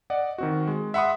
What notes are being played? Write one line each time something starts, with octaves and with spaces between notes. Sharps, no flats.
D5 D#5 F#5
D#3 C4 F#4
G#3
E5 F#5 B5 C6 D#6